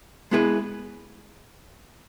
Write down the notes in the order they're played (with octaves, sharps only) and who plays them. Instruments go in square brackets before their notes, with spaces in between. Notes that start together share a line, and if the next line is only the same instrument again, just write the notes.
[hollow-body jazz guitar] G#3 B3 E4 G#4 B4